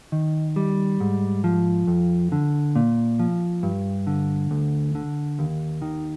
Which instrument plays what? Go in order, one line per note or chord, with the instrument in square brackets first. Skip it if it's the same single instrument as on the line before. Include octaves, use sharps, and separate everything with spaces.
[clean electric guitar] D#3
G3
G#2
F3
F2
D3
A#2
F3
G2
D3
D2
D3
D#2
D#3